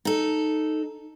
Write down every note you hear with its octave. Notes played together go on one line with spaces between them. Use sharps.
D#4 A4